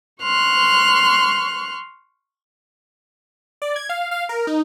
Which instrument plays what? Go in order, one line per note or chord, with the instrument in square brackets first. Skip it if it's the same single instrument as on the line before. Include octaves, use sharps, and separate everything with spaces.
[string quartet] C6 C#6 F6 F#6
[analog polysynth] D5
G#6
F5
F5
A#4
D#4